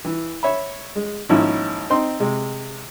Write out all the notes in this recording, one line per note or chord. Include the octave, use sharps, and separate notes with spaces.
E3
C#5 E5 B5
G#3
G#1 D#3 F3 A#3 C#4 E4
C4 D#4 C6
C3 G#3